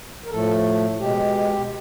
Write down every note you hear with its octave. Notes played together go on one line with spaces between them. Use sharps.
A#4
A2 F3 A3 A4
B2 G#3 G4